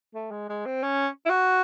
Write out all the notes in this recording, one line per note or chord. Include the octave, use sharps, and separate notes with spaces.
A3
G#3
G#3
C4
C#4
E4
F#4